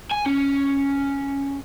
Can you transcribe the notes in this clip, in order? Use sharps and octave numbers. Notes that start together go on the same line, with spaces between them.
G#5
C#4